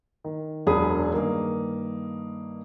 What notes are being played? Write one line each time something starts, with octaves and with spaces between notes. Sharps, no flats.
D#3
E1 F#2 D4 G#4 B5 D#6
G2 D#3 A#3